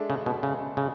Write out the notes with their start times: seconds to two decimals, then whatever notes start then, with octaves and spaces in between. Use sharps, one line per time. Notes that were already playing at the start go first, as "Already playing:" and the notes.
Already playing: G#3 D4 A4 E5
0.10 C#3
0.26 B2
0.43 C#3
0.77 C#3